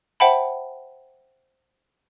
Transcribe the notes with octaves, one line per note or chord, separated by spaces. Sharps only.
C5 E5 F#5 G5 A5 B5